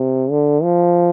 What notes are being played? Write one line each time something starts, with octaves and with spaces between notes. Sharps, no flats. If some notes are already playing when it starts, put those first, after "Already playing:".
Already playing: C3
D3
F3